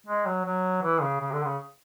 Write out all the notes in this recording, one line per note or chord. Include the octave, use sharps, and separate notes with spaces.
G#3
F#3
F#3
E3
C#3
C#3
D3
C#3